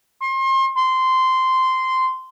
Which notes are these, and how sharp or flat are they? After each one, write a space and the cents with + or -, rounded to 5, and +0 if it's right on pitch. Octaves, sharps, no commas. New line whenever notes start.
C6 +35
C6 -10